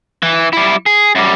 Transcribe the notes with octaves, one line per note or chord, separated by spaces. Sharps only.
E3
G3 E4
G#4
F#2 G3